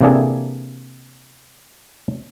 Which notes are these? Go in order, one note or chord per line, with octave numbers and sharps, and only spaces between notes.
C3 E3 A#3 D4 G#4 A4